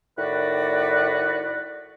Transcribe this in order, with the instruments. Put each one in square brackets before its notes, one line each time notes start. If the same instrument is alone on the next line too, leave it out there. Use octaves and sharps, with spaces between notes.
[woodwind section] A2 D#3 F#4 B4 D5